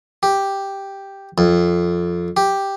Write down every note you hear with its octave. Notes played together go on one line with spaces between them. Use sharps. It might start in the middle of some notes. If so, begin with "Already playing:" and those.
G4
F2
G4